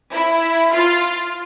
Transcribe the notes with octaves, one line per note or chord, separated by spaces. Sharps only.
E4
F4